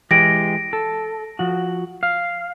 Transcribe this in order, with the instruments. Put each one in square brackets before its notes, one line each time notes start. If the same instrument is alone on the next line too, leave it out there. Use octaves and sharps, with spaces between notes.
[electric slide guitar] E3 G#3 G4 [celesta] A#6 D7
[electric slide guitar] A4
F3 F#4
F5